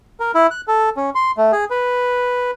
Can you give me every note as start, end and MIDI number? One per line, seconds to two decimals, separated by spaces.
0.20 0.31 70
0.35 0.47 64
0.51 0.61 90
0.68 0.89 69
0.97 1.10 61
1.15 1.31 84
1.37 1.52 57
1.52 1.65 68
1.70 2.51 71